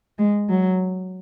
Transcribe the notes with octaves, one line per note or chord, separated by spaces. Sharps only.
G#3
F#3